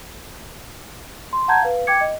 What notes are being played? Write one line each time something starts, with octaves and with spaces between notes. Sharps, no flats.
C6
F#5 A5 A#5 G6 G#6
B4 F5
G5 D6 G#6 C#7
D#5